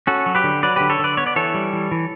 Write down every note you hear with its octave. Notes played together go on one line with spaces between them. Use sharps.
C#4 F#4 A4
F#3
G4 B4
D3
F#3 B4 D5
D3 G4 B4
A4 C#5
D3 B4 D5
B3 C#5
D5
E3 A4 C#5
G3
E3
E3